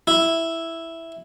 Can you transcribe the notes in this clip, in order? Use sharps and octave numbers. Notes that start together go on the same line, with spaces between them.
E4